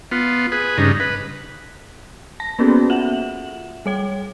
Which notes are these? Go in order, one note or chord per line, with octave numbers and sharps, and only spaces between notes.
B3 F4
G#4 B4
G2 C#3 D#4
B4
A5 A#6
A#3 B3 C#4 F#4 G#4 A4
F4 E5 F#5 E7 F#7
G3 C#5 G5